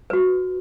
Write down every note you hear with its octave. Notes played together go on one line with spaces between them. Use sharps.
F#4 B4